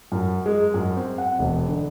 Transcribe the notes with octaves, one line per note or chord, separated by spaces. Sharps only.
F#2
G#3
F#2
C4
F#5
E1
D3